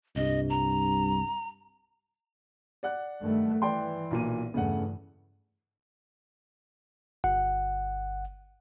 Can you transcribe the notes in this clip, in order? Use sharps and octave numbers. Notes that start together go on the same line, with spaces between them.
C2 G2 D#5
A#5
D5 F#5 F#6
G2 D#3 A3
E3 D5 G5 C6
B1 A#2 D#7
E2 G2 C#3 A3 F#5
G1 F#5